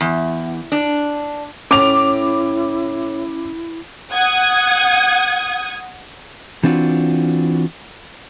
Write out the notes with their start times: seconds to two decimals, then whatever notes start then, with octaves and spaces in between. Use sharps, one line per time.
0.01 E2
0.72 D4
1.71 A2 C#4 E4 D6 F7
4.11 F#5 D#6 G#6
6.64 E3 C4 D4 F4 F#4